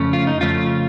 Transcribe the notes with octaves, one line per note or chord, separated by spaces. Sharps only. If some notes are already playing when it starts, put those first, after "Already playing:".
Already playing: F2 C#3 A3 C#4
F4
D#4
F2 C#3 A3 C#4 F4